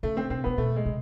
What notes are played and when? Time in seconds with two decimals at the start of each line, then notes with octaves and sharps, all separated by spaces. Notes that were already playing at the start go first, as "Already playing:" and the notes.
0.03 C#3 A3
0.17 C4
0.30 C3 C4
0.44 C3 B3
0.58 B2 A3
0.76 G#3
0.86 C3